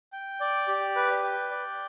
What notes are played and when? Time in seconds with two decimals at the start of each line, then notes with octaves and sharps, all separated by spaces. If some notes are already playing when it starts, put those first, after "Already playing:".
0.13 G5
0.41 D5
0.68 G4
0.96 B4
1.23 G5
1.51 D5